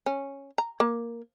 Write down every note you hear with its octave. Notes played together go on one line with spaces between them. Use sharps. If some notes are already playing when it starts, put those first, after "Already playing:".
C#4
A#5
A#3